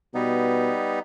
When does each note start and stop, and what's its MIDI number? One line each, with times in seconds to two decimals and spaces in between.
0.15 0.71 47
0.15 0.99 55
0.15 0.99 59
0.15 0.99 63